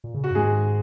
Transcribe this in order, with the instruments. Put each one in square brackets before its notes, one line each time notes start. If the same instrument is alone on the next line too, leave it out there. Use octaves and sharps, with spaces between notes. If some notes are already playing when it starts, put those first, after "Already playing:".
[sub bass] A#2
C#3
[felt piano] F#4
[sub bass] F#2
[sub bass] G#2 [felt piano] G#3 G#4